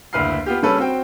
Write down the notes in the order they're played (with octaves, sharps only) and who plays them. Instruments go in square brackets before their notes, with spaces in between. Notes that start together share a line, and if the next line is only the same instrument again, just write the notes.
[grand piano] F#1 D2 E4 B4 F6 C7
B3 F4 G4
C#3 G3 C#4 A4 B4
C4 F#4 G5